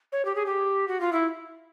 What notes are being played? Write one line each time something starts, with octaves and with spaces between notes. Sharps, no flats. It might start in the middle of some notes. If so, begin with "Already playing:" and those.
C#5
G4
G#4
G4
F#4
F4
E4